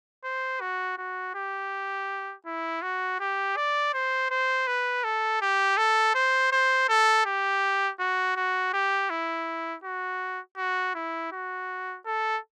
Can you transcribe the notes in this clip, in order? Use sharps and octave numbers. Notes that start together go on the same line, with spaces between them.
C5
F#4
F#4
G4
E4
F#4
G4
D5
C5
C5
B4
A4
G4
A4
C5
C5
A4
G4
F#4
F#4
G4
E4
F#4
F#4
E4
F#4
A4